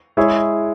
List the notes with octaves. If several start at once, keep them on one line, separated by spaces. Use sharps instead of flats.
G#3 E4 G#4 C#5